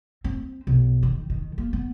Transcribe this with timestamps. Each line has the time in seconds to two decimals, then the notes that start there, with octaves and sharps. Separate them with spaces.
0.24 C4
0.67 B1
1.03 D#3
1.30 D#3
1.58 A#3
1.73 B3